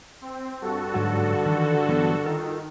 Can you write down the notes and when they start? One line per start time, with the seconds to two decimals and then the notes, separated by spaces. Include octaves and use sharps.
0.21 C4
0.61 G2 F#4 A4
0.94 G#2 D3 F#3 F#5
1.46 D#3 E3
1.89 E3 F#3 B3
2.24 D#3 F4 A4 A#4